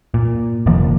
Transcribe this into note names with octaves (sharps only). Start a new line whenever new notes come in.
A#2
F1 D#3 F3 A#3